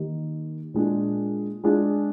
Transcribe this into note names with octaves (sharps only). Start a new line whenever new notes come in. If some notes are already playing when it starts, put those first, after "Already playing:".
Already playing: D#3 A#3 D#4 G4
A#2 G#3 D4 F4 G#4
G#3 D4 F4 G#4